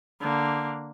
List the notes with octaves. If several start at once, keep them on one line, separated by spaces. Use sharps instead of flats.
D3 A#3